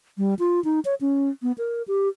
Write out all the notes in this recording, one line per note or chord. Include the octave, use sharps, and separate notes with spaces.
G3
F4
D#4
C#5
C#4
B3
A#4
G4